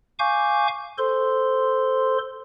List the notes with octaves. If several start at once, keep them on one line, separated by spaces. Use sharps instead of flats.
F5 G#5 C#6 D6 G6
A4 C5 C6